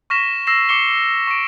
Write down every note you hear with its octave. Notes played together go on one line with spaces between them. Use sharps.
C#6 F6 A#6 B6 E7
E6 A#6 C7 E7
D6 C7 C#7 E7 G7
C#6 D7